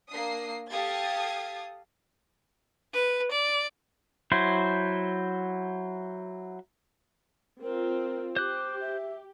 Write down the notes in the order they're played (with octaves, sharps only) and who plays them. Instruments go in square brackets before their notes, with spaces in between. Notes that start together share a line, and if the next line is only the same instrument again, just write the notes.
[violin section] A#3 D4 D#6 C7
G4 A4 F5 D#6 G#6 A6
[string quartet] B4
D5
[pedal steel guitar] F#3 E4 C5
[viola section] C4 F4 [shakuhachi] A#4
[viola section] G4 [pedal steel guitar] C5 F#6 [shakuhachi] D6
[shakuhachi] E5